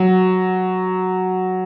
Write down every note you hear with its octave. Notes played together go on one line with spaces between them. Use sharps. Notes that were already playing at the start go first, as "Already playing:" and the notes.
Already playing: F#3